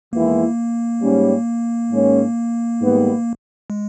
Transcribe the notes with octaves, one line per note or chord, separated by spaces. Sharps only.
E2 D#3 G#3 A#3 B3 E4
G#2 G3 C#4
G#2 D#3 G#3 C#4
G#2 D#3 G3 B3
G#3